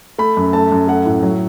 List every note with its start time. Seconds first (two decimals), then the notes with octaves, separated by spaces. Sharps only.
0.19 A3 B5
0.37 F#2
0.53 A3 A5
0.72 F#2
0.88 A3 F#5
1.06 A2
1.23 F#3